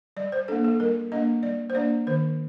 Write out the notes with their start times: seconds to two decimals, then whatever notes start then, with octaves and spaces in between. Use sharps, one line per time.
0.17 G3 D5
0.32 C5
0.48 A#3 D4 A4
0.64 A4
0.80 G3 A#4
1.12 A#3 D4 D#5
1.43 G3 D5
1.70 C5
1.75 A#3 D4 D5
2.07 D#3 C5